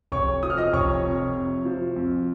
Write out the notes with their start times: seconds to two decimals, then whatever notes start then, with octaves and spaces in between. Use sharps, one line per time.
0.12 F1 C#5 C#6
0.43 F3 D#6
0.50 F6
0.57 D#5 D#6
0.73 F1 C#5 C#6
1.04 F2
1.35 C3
1.65 F3
1.96 F2